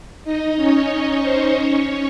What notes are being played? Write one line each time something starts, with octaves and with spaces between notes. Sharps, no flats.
D#4 D#5
C#4 C#5
C5
C#4 C#5